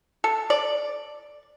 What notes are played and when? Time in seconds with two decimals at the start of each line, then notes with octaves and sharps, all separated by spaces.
0.24 A4
0.50 D5